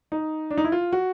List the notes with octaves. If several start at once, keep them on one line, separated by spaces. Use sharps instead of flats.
D#4
D4
D#4
E4
F4
F#4